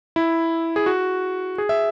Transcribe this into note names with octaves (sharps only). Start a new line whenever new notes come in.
E4
G#4
F#4
G#4
E5